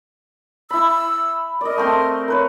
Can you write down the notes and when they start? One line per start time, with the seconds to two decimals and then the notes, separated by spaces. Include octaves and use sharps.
0.71 E4 B5 E6
1.61 A#4 D5 D#5
1.78 A3 C4 C6
2.28 A#4 B4 C#5